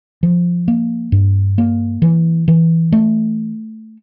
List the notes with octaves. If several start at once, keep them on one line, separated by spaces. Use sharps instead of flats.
F3
A#3
G2
A#3
E3
E3
A3